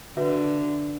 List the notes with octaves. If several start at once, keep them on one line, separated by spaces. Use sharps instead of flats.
D3 F#4 B4 E5